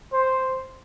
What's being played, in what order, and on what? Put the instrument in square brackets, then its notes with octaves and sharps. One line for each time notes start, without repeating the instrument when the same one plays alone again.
[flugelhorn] C5